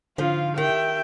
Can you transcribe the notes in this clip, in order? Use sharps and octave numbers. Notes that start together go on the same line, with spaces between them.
G#2 D3 F3 F4 F5
D#3 G4 E5 G5